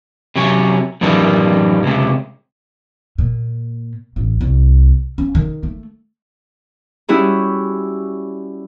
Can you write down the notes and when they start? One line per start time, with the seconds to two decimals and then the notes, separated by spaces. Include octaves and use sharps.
0.36 C3 F#3 C#4
1.01 F#2 A2 D#3 E3 G3
1.83 C#2 C3
3.18 A#2
4.16 A1
4.41 C2
5.18 C#4
5.35 D#3
5.63 A3
7.09 G3 C#4 E4 F#4 G#4